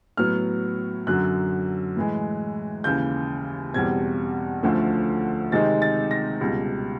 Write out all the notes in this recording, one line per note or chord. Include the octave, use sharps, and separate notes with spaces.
A2 F#3 B3 F6
F#2 D3 F#3 F#6
A2 E3 G#3
D#2 C#3 E3 G6
E2 B2 G3 C4 G#6
D2 D3 F3 A3 C#4
C3 D#3 G#3 C4 D#4 A6
A6
A#6
C#2 B2 G3